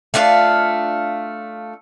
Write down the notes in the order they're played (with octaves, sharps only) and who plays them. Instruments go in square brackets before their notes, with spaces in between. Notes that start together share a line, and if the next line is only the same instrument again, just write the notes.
[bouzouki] A3 D4 F4 F5